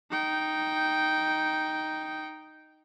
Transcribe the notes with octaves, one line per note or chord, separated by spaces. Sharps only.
D#4 G5